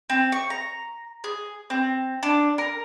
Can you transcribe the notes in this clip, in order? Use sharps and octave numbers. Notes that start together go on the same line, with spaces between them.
C4
C#6
A#5
G#4
C4
D4
A#4